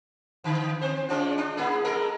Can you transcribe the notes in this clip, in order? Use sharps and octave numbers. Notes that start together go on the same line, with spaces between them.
D3 E3
C4 C5
G#3 C#4 F4
D4
A#3 E4 G#4
G#3 A4 A#4